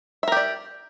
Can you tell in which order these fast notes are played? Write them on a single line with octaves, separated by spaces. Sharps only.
E5 A#4 G4 D5